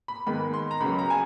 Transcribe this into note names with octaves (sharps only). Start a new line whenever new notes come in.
B5
G#2 D#3 G#3 B3 B5
C6
A#5
C#2 C#3 F#3 B5
A#5
G#5